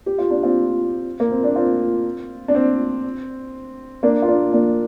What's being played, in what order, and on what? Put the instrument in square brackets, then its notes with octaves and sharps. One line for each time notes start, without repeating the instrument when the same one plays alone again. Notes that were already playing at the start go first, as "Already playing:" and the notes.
[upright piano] G4
F4
D4
C4 F4
A#3
C4
D4
C4 F4
D4
C4
A#3 D4
F4
A#3 D4
A#3 D4